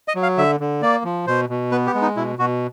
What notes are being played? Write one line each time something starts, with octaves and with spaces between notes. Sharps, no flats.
D#5
F#3
F5
D3 E5
D3
A#3 D5
F3
B2 C5
B2
B3 B4
G4
G#3
D#4
B2 E4
B2 F#4